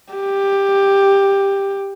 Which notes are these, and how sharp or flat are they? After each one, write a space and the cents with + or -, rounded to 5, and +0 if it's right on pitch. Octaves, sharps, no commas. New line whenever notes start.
G4 +10